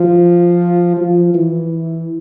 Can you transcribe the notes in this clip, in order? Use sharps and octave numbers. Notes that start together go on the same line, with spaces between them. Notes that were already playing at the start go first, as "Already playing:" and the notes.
Already playing: F3
F3
E3